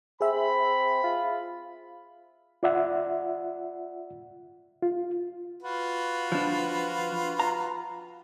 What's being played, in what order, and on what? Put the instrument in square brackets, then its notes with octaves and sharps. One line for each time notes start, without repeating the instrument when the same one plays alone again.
[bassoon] C4 [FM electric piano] G#4 E5 [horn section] B5
[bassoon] F4
[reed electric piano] F4 D5 E5 F#5
F4
[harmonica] F4 F#4 B4
[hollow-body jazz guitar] F3 D4
A#5